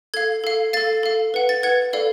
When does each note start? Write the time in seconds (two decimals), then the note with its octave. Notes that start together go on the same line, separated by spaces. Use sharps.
0.14 A4 F5 G#6
0.44 A4 F5
0.73 A4 F5 A6
1.03 A4 F5
1.34 B4 F#5
1.49 A6
1.63 B4 F#5 G#6
1.93 A4 D5 F5